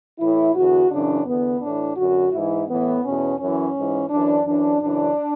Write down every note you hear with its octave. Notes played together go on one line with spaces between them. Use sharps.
A2 E3 E4
E2 D3 F#4
F#2 C#3 E3 D4
E2 D3 B3
A2 E3 D4
F#2 D3 F#4
G#2 E3 E4
A2 E3 B3
E2 B2 C#4
F#2 E3 C#4
G#2 E3
F#2 E3 D4
F#2 E3 D4
F#2 C#3 E3 D4